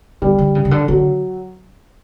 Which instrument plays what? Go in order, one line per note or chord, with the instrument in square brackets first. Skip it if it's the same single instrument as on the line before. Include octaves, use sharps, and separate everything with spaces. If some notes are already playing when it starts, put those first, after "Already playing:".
[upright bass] D3 [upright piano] G3
[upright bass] D3
C#3
C#3
D3
[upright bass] D3 [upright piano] F#3